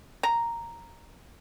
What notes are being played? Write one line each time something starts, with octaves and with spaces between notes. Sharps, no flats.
A#5